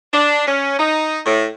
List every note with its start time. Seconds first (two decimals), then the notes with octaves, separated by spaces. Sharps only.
0.13 D4
0.47 C#4
0.78 D#4
1.26 A2